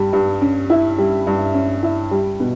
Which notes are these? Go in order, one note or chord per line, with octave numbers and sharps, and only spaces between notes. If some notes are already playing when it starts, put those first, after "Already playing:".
Already playing: G2 G3
G2
C#4
E4
G3
G2
C#4
E4
G3
B2